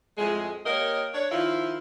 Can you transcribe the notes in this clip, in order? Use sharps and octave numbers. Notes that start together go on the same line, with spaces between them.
F2 A2 G#3
A#3 G4 A#4 C#5 D#5
D4 C#5
D#3 F3 E4 F4